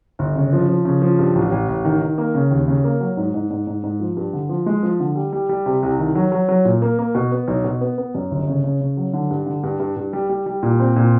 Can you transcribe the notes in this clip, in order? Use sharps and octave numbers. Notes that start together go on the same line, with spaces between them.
G1
C#3
F3
F3
C#3
F3
G2
A1
A1
A1
D#3
D#3
A#3
C#3
D#2
C#3
A#3
F#3
G#2
G#2
G#2
G#2
G#2
F3
G2
D3
F3
G#3
F3
D3
G3
G3
G3
C3
C2
D#3
F#3
F#3
F#3
A#2
A#3
A#3
B2
B3
B1
B2
B3
B3
F#2
G1
C#3
C#3
C#3
F#3
D3
G2
D3
G2
G2
G2
G3
G3
G3
A#2
C4
A#2